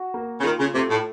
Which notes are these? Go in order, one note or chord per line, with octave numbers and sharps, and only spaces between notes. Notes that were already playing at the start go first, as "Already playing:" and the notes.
Already playing: F#4
A#3
C#3
D#3 F4
C#3
C3 A3
A2